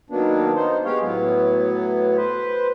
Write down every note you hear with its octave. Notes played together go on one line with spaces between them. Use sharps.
D#3 F#3 A#3 B3 D4
B3 D#4 C5
G#3 B3 G4 C#5 F5
A2 F#3 B3
B4 C5